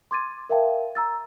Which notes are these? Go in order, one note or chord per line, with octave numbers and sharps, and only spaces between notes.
C6 D6 G#6 A6 D#7
A#4 E5 F5 G5 A5
A#5 E6 A6